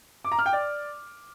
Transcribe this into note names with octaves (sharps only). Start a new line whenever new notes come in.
D6
A#5
F6
G5
D5